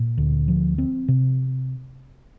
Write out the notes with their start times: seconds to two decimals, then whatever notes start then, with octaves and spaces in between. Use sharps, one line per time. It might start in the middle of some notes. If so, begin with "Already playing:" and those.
Already playing: A#2
0.18 D2
0.48 F3
0.78 C4
1.08 C3